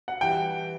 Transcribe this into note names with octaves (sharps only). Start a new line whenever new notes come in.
F#5
E3 G3 G5